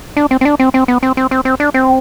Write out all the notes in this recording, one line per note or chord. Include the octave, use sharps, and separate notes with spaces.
D4
C4
C4
D4
C4
C4
B3
C4
C4
C4
C4
D4
C4